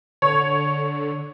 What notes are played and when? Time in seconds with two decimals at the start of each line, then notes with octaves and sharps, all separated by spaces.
0.22 D3 C#5